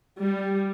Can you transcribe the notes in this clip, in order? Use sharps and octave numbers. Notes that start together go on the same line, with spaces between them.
G3